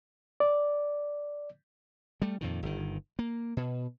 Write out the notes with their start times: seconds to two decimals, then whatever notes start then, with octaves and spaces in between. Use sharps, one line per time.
0.40 D5
2.22 G3 A3
2.41 F2 A#2 D#3
2.63 G1 D#3
3.19 A#3
3.57 B2